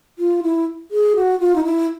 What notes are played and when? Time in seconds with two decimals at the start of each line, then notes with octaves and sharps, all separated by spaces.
0.19 F4
0.43 E4
0.91 G#4
1.16 F#4
1.40 F4
1.55 D#4
1.64 E4